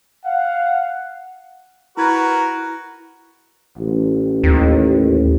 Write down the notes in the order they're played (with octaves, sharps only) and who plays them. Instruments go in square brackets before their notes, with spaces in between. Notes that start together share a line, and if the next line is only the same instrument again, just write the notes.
[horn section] F5 F#5
[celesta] E4 G#6 A6 [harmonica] F#4 A#4 B4
[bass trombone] A1
[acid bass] D#2